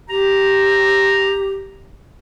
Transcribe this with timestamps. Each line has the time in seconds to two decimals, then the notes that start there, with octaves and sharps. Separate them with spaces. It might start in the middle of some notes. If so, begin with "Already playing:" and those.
0.09 G4 A#5